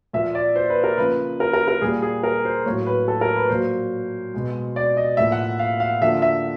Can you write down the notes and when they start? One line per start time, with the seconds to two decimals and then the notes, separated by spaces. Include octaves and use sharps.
0.13 A#2 F3 A#3 E5
0.35 D5
0.56 C5
0.70 B4
0.84 A#4
0.98 C#3 F3 A#3 B4
1.40 A#4
1.53 A#4
1.68 A#4
1.81 A#2 G3 A#3 G#4
2.02 G#4
2.23 A#4
2.45 C5
2.65 A2 F#3 A#3 C#5
2.87 B4
3.08 A4
3.21 A#4
3.36 B4
3.49 A#2 F#3 A#3 C5
4.34 B2 G#3
4.76 D5
4.97 D#5
5.17 A2 F3 A#3 E5
5.32 F#5
5.59 F5
5.80 F5
6.01 D3 F3 A#3 E5
6.22 E5